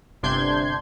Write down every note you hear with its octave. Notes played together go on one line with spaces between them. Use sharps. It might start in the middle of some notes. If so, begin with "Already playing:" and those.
G1 C3 D4 C6 G6 G#6